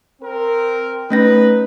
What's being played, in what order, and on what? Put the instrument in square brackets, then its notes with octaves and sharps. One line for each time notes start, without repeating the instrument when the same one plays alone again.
[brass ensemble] C4 A#4
[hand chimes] A3 C#4 A#6 [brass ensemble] D#4 B4